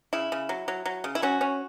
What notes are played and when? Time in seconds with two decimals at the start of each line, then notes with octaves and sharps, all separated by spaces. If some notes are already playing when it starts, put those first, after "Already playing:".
0.13 C#3 E4
0.32 C#3
0.49 F#3
0.68 F#3
0.85 F#3
1.04 C#3
1.15 E4
1.22 F#3 C#4 F#4
1.41 C#4